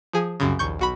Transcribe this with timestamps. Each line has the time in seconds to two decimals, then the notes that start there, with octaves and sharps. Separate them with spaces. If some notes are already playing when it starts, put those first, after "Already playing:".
0.13 F3 G#4
0.40 C2 F#2 C#3
0.59 A#1 D#2 C#6 G6
0.79 B1 F#4 B5